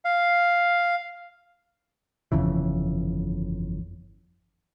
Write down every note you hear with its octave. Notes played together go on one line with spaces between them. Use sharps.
F5
G1 F2 C#3 E3